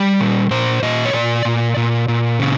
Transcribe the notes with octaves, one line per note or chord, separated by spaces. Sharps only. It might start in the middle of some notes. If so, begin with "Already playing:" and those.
Already playing: G3 D5
A#2
A#2 C5
A#2 D#5
C#5
A#2 D5
A#2
A#2
A#2
C#3